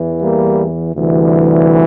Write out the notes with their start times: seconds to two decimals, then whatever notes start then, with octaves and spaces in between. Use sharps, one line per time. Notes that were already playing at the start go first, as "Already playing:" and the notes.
Already playing: E2 E3
0.22 G3 A#3
0.94 D2 C3 E3 G3